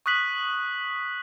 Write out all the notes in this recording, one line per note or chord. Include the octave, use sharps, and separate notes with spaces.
C#6 D#6 F#6 B6 F#7